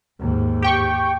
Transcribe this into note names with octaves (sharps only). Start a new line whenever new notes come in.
D#2 G#2
G4 G5 C#6